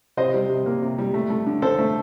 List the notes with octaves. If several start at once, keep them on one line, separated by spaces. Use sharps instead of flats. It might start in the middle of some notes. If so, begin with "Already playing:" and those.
C3 C5 D#5
G3
C3
A#3
C3
G3
A3
A3
D3
D3 A4 C5
A3